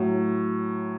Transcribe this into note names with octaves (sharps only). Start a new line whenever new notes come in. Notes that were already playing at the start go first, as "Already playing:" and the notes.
Already playing: A2 F#3